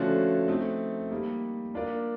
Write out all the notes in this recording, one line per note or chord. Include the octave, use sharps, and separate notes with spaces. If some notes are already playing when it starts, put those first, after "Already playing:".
Already playing: D3 F3 A3 C#4 F#4
A3 C4 D#4
G3 A#3 D#4
A#3 D4 F4 A#4 D5